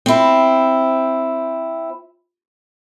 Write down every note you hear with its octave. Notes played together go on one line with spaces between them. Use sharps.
C4 E4